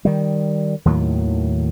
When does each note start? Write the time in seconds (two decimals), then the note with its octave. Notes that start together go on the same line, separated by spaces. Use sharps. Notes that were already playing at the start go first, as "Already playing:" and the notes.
0.05 D#3 G3
0.85 D#2 A2 D#3 F#3